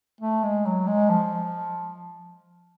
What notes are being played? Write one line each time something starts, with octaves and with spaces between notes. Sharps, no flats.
A3
G#3
F#3
G#3
F3